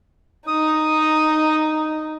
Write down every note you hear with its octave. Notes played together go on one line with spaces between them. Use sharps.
D#4 D#6